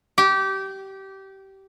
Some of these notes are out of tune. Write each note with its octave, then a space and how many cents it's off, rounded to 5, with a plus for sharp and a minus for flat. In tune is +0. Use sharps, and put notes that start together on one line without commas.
G4 -20